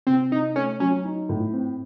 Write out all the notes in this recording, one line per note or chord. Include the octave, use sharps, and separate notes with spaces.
C3 C4
C3 D#4
A3 C#4
F#3 C#4
D#4
A2
C4